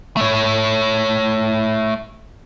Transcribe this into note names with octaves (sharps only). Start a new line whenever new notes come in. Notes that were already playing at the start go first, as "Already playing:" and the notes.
A3 C#5